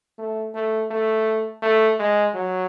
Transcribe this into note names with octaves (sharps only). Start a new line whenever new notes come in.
A3
A3
A3
A3
G#3
F#3